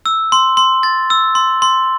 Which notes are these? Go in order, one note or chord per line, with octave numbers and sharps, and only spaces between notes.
E6
C6
C6
A6
E6
C6
C6